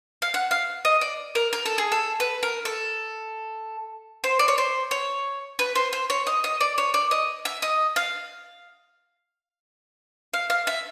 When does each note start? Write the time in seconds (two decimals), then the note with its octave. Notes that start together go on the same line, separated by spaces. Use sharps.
0.22 F5
0.34 F#5
0.51 F5
0.85 D#5
1.01 D5
1.35 A#4
1.53 A#4
1.66 A4
1.78 G#4
1.92 A4
2.20 B4
2.43 A#4
2.65 A4
4.24 C5
4.39 D5
4.48 C#5
4.58 C5
4.91 C#5
5.59 B4
5.75 C5
5.93 C5
6.10 C#5
6.27 D#5
6.44 D#5
6.61 D5
6.78 C#5
6.94 D5
7.11 D#5
7.45 E5
7.62 D#5
7.96 F5
10.33 F5
10.50 F5
10.67 E5